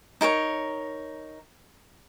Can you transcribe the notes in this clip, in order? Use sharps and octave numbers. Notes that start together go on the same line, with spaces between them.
D#4 A#4 C5 C#5